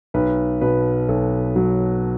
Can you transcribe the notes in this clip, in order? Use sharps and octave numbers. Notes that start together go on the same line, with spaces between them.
B1 B4
B2 B4
B1 A4
F#3